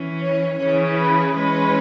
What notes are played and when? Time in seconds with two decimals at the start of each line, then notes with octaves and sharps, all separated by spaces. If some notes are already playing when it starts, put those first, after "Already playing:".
Already playing: E3 C#4
0.21 C#5
0.58 C#3 E3 C#4 C#5
0.97 B4
1.34 E3 G#3 C#4 B4